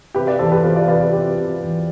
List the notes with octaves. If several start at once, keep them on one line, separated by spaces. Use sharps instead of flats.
C3 G4 B4
B4 D5
E2 A4 C5
G4 B4
E2 F4 A4
B4 D5
C3 B4 D5
G4 B4
C3 G4 B4
C3
E2